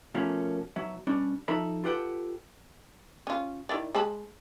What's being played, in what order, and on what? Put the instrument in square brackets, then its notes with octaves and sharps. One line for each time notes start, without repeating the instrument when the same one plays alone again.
[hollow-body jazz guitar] B2 F3 A3 A#3 C#4 A#4
B1 F#3 E5
B2 G3 C#4 D4
F3 D#4 A4 E5 A#5 B5
F4 G4 A4 B4 F#5 G5
[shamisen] C#4 F4
D#3 E4 D5
G#3 A5 B5